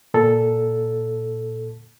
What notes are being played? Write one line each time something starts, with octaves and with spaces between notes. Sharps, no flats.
A#2 A4